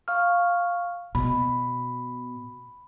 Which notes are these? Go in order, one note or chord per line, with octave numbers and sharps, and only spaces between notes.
F5 C#6 F6
B2 B5